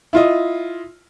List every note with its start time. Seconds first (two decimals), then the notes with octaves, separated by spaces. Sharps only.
0.13 E4 F4 D#5